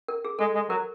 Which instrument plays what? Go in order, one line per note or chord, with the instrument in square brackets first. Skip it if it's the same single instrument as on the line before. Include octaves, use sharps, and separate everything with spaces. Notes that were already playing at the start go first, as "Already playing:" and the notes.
[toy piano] A#4
G#4
[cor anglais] G#3 [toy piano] A4
[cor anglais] G#3
[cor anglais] F#3 [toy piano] A#4